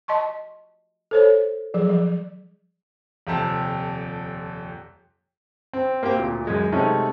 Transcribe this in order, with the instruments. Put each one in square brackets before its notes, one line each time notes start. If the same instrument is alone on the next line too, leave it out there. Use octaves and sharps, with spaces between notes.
[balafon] D#5 A5 C6 C#6
A4 C5 C#5
F3 F#3 G#4
F3 G3
[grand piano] D#1 F2 C3 A5
[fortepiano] C4
A#3 C4 G4 G5
D2 A#2
F#2 G#3
C3 G#3 A3 C#4 D#4